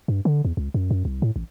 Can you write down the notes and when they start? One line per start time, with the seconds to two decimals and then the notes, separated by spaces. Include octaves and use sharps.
0.08 G2
0.25 D3
0.45 E2
0.57 C#2
0.74 F#2
0.91 F#2
1.05 C2
1.22 A2
1.36 A1